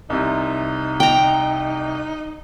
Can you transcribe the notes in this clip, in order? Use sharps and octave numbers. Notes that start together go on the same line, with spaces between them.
C2 C3 D#4
G5 A#5